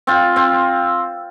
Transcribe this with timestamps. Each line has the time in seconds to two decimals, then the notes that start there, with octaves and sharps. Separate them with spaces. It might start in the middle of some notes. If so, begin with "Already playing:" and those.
0.07 C4 F4
0.36 C4